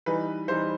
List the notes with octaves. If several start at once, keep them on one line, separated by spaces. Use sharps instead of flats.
E3 G3 D#4 B4
E3 G3 D#4 C5